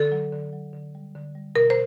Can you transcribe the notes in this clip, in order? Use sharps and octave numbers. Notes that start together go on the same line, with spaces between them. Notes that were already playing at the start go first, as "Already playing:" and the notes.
Already playing: D3 A4
F#3
D3
F#3
D3
G3
D3
G3
B2 A#4
C5